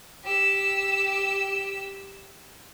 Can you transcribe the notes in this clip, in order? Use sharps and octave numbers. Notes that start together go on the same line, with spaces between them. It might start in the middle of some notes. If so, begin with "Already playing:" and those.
G4 E6